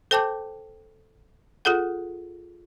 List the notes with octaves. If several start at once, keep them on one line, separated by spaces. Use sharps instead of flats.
A4 C5 G5 A5 D6 G6
F4 G#4 A4 F#5